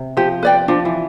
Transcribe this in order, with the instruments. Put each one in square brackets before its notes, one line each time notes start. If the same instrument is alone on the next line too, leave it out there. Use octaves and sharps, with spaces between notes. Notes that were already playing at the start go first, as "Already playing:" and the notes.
Already playing: [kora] C3
[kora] F3 [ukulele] G4
[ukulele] B4 D5 G5
[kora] F3 [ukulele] D4
[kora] E3